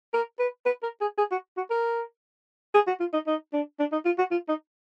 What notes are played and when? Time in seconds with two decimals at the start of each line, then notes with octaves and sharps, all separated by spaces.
0.14 A#4
0.39 B4
0.66 B4
0.83 A#4
1.01 G#4
1.18 G#4
1.32 F#4
1.57 F#4
1.70 A#4
2.74 G#4
2.88 F#4
3.00 F4
3.13 D#4
3.27 D#4
3.53 D4
3.80 D4
3.92 D#4
4.05 F4
4.19 F#4
4.31 F4
4.48 D#4